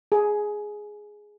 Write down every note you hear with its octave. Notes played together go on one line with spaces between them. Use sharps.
G#4